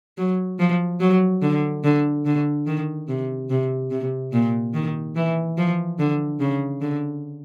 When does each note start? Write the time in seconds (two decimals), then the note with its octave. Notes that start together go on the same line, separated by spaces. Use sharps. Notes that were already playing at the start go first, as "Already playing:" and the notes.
0.18 F#3
0.59 F3
1.00 F#3
1.42 D3
1.84 D3
2.26 D3
2.67 D#3
3.08 C3
3.50 C3
3.91 C3
4.33 A#2
4.74 D#3
5.16 E3
5.58 F3
5.99 D3
6.40 C#3
6.81 D3